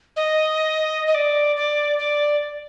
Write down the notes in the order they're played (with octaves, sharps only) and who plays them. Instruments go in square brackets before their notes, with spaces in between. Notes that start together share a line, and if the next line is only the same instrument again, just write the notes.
[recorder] D#5
D#5
D5
D5
D5